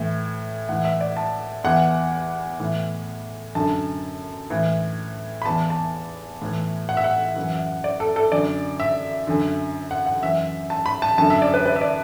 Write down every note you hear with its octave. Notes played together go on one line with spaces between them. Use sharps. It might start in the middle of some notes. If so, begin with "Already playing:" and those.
Already playing: A2 E3
A2 E3 F#5
E5
D5
A5
E2 E3 F#5
A2 E3
F#2 D3 A5
A2 E3
B5
E2 E3 A5
A5
A2 E3
F#5
E5
F#5
F#2 E3
D5
A4
A4
F#2 D3 D5
E5
F#2 D3
F#5
F#5
F#2 E3 E5
A5
B5
A5
F#2 D3 A5
E5
D5
B4
B4
E5
D5